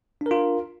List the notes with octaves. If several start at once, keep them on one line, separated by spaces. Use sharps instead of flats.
D4 F4 A#4